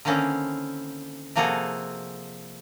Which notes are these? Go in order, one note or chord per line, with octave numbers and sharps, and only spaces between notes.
D3 D#3 A#3 C4 C#4 E4
C3 F3 A#3 F#4 G#4 A4